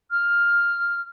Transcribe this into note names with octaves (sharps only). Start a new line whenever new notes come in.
F6